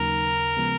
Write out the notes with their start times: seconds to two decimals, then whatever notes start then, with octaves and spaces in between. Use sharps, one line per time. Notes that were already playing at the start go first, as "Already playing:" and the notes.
Already playing: D#2 C#3 F#3 A#3 D#4 A#4
0.57 C#3 F3 G#3 B3